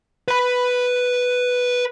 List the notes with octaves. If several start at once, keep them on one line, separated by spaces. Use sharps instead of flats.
B4 B5